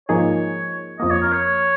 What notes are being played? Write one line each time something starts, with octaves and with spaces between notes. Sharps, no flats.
G#2 F3 A#3 D#4 G#4 C#5
F2 F3 A#3 D#5
C#5
A#4
C#5